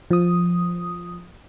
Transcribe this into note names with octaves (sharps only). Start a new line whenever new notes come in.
F3 D#6